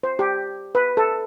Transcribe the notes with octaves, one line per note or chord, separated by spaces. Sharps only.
C5
G4
B4
A4